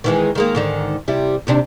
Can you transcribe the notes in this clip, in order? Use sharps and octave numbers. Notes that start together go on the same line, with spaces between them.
D#3 E3 G#3
D#3 G#3 A#3
G#2 D3 D#3
C3 G3 E4
D#2 C3 D4